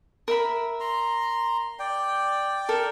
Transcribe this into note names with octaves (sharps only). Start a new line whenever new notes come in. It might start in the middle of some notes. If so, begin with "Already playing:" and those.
A#4 E5 B5
A#5 C6
D5 G5
A4 A#4